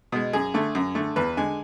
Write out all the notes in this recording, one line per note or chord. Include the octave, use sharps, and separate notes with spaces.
B2 G#3
F#2 G#4
D3 A3
F#2
D3 A3
E2 B4
D3 G#3 G#5